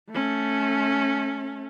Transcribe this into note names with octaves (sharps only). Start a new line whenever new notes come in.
A3 C#4